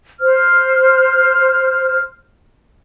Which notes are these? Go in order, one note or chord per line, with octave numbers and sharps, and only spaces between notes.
C5 F6